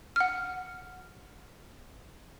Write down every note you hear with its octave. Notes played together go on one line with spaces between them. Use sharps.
F#5 F6